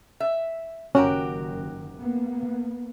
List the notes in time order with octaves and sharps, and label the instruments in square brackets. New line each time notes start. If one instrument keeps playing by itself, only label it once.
[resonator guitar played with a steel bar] E5
[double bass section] F#1 F#2 D#3 [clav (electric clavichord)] C#4 [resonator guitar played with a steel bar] F#4 G4 A#4
[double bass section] A#3 B3